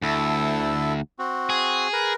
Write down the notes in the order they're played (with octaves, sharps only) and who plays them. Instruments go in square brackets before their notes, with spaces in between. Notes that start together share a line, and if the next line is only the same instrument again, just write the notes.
[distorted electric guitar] D2 [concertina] E4 A4
[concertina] C4 F#4
[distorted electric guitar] G#4
[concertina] A#4 B4